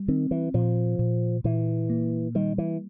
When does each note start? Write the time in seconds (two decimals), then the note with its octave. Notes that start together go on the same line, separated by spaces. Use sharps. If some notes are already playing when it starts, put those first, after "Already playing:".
Already playing: G3
0.08 D#3 C4
0.31 E3
0.54 A#2 F3
0.99 A#2
1.44 A#2 E3
1.90 A#3
2.35 D#3 G3
2.58 E3